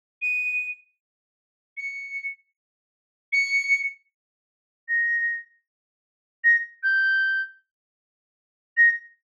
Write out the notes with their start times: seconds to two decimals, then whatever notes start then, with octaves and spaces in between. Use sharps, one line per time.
0.22 D#7
1.77 C#7
3.33 C#7
4.88 A#6
6.44 A#6
6.83 G6
8.77 A#6